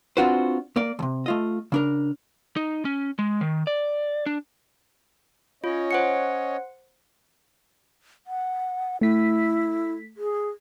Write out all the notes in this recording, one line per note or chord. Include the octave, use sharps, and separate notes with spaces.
C4 D4 F4 F#4 B4 C5
A#3 D5
D2 C3
A3 F4 D#5
C#3 D4 A#4
D#4
C#4
G#3
D#3
D5
D4
C#4 F4 C#5 D#5
C5 F#5 C#7
F#5
A3 E4 B6
G#4